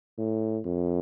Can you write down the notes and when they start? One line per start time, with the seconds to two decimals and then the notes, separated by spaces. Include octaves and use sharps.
0.18 A2
0.65 F2